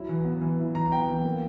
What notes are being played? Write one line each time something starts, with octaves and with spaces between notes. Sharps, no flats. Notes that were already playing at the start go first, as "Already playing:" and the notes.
Already playing: F#3 E4
E3
B3
E3
E4
E3 A#5
A#5
B3 G5
E3
A#3